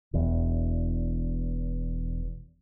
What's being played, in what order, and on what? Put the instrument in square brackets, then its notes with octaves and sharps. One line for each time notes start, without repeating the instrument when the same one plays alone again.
[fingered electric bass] E1 E2